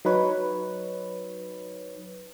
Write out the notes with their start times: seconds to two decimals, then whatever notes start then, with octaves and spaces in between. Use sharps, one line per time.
0.05 F#3 D#4 B4 C#5